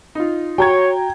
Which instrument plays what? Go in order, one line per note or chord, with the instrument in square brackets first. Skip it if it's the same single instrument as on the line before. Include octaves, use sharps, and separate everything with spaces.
[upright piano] D#4 F4
[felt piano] F#4 [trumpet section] C#5 [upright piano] G5 A#5 G#6